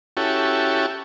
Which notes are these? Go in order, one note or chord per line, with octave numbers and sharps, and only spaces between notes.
C#4 E4 F#4 G4 A4